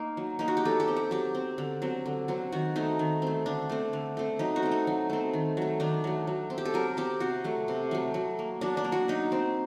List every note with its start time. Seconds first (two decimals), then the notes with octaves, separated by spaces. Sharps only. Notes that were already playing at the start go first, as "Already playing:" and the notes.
Already playing: A#3 D#4
0.17 F#3
0.39 A#3 D#4
0.48 F#4
0.57 G4
0.65 F#3 A4
0.80 G4
0.88 C4
0.96 G4
1.11 F#3 G4
1.35 C4
1.58 D3
1.82 F#3 C4
2.06 D3
2.28 F#3 C4
2.52 D#3 F#4
2.76 A3 C4 D#4
2.99 D#3
3.22 A3 C4
3.46 D3 D4
3.70 A3 C4
3.93 D3
4.17 A3 C4
4.39 F#3 D#4
4.56 F#4
4.63 A3 C4
4.71 D#4
4.87 F#3
5.10 A3 C4
5.33 D#3
5.57 F#3 A3
5.80 D#3 D4
6.04 F#3 A3
6.27 F#3
6.50 C4
6.58 G4
6.65 A4
6.74 F#3 A#4
6.97 C4 G4
7.20 C3 F#4
7.44 F#3 A3
7.68 C3
7.91 F#3 A3
8.14 F#3
8.39 A#3
8.61 F#3 D4
8.77 D4
8.84 A#3
8.92 F#4
9.08 F#3 D#4
9.32 C4